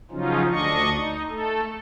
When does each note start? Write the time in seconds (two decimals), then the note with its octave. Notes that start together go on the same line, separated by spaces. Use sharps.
0.11 C#3 F3 F#3 C#4 D#4 F4
0.51 D2 D4 D#5 C#6
0.94 D#4
1.29 A3 A4